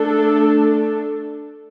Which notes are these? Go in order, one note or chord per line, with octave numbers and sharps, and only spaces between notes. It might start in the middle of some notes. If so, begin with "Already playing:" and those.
Already playing: A3 D4 A4